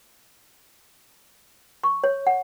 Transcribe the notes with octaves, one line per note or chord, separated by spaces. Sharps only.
C#6
C#5
F#5